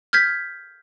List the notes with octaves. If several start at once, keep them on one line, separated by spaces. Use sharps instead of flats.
F6 G6 G#6 B6